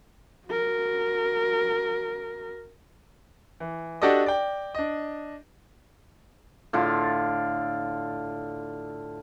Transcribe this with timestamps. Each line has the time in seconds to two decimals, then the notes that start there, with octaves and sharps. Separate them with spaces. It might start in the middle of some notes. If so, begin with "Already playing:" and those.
0.48 F#4 A#4
3.60 E3
4.02 D4 F#4 G4 A4 D5 D#5
4.26 D5 G5
4.75 D4 D#5
6.73 A2 D3 F4